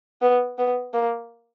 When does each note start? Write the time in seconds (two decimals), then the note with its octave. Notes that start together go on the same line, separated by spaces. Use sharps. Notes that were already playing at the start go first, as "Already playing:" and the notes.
0.22 B3
0.58 B3
0.94 A#3